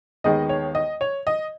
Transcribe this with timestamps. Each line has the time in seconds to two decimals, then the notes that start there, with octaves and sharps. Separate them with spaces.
0.24 D#2 D#3 G#3 B3 D#5
0.49 C#5
0.75 D#5
1.01 C#5
1.27 D#5